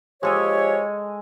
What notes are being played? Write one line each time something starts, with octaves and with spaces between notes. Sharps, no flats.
F3 G#3 G4 A4 C#5 G#5